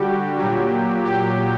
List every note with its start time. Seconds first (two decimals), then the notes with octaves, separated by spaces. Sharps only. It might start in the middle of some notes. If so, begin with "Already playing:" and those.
Already playing: D3 G3 F#4 G4
0.38 A#2 F#3
1.05 G4